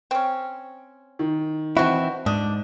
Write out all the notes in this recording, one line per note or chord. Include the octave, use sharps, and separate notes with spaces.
C4 C#4
D#3
B2 E3 C4 E4 F#4
G#2 D4 D#6